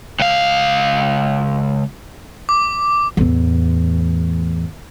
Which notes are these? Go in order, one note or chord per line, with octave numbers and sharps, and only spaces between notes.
C#2 F5
D6
E2 A2